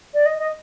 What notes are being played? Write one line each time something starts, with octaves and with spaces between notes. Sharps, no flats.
D5
D#5
D#5